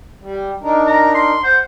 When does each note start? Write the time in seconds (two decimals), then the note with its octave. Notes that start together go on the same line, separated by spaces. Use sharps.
0.22 G3
0.62 D4 D#4 A#4
0.87 A#5
1.15 C6
1.44 C5 F#5